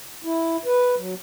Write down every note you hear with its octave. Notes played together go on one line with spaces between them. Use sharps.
E4
B4
F#3